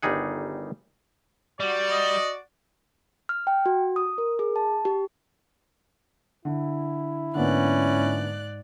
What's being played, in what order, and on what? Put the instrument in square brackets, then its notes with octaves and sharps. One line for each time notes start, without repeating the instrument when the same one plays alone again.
[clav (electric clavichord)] G1 D#3 G3 D#4 G#4 F#5
[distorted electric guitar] G3 [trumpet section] F#4 D5
[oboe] D#5
[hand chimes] F6
G5
F#4
D#6
A#4
G#4
A5
G4
[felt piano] D3 [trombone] E4
[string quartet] G#2 D5 F#6 [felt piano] D3 A#3 B3 [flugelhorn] C#4